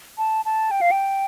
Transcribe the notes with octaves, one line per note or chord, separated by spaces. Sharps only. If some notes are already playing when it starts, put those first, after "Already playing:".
A5
A5
G5
F5
G5